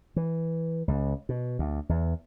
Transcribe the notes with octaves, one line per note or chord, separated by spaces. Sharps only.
E3
C#2
B2
D2
E2